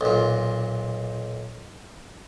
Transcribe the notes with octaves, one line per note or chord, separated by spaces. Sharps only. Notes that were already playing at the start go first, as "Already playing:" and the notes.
B1 A#2